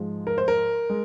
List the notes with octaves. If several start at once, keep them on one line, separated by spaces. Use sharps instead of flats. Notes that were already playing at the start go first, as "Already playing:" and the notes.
Already playing: G#2 F3 G#3
A#4
C5
A#4
G#3